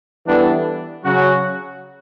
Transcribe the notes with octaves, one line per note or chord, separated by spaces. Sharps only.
E3 G3 B3 D4 A4
C#3 F#3 C#4 F#4